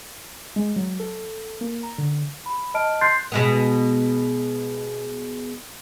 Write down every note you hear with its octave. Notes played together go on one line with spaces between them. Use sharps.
G#3
F#3
A4
A#3
A#5
D3
B5
D#5 A5 F6 D7
C6 F#6 G6 A6 C7
B2 G#3 B3